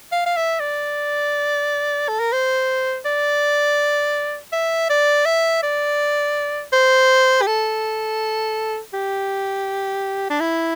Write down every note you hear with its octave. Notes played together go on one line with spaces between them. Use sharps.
F5
F5
E5
D5
A4
A#4
C5
D5
E5
D5
E5
D5
C5
G4
A4
G4
D4
E4